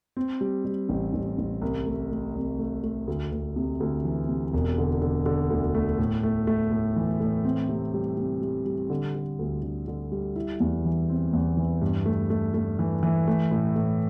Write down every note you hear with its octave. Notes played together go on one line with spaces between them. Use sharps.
C4
G3
G3
A1
A1
A1
C2
A3
A3
C2
A3
A3
D2
D2
C3
D2
E3
C3
E1
D3
D3
D3
D2
A3
A2
A3
A3
A2
E3
A2
C4
C3
G3
C3
G3
G3
D3
D3
D2
D3
D3
G3
E4
E2
E3
C4
E2
E3
G2
A3
A3
A3
E3
E3
A3
A2
A2